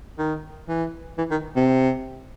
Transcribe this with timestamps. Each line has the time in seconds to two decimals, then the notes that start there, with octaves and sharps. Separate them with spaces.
0.19 D#3
0.69 E3
1.18 E3
1.31 D#3
1.56 C3